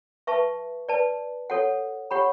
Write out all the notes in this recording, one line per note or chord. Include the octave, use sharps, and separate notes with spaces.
B4 E5 A5 C#6
B4 D5 A5
F#4 A4 C#5 F#5
G4 C#5 F#5 B5